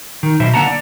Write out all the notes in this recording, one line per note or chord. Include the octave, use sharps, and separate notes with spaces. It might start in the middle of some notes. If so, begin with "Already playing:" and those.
D#3
B2 F#3 C5 E5
D3 A#3 F#5 A5 A#5
D5